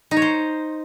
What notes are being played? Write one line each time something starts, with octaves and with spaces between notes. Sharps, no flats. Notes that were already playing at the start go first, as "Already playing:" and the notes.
D#4
C#5
C5